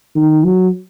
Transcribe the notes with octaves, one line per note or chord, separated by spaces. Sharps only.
D#3
F#3